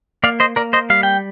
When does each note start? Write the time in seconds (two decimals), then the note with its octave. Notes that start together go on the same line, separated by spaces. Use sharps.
0.23 A#3 D5 F5
0.40 C5 D#5
0.56 A#3 A#4 D5
0.73 C5 D#5
0.90 G3 F5
1.03 G5